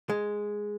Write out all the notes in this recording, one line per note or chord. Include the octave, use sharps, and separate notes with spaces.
G#3